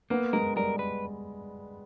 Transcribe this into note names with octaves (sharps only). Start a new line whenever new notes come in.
A#3 B3
G#3 A#4
G3 A#4
B4